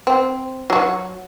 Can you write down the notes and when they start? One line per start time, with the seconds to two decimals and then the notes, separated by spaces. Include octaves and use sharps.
0.07 C4
0.70 F#3 F#4